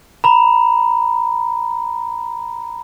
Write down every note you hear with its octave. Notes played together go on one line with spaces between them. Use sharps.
A#5 B5